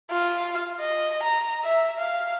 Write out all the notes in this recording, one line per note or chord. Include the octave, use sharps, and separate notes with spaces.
F4
D#5
A#5
E5
F5